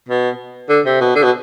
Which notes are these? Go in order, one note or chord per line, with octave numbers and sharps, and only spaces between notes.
B2
D3
C3
B2
D3
B2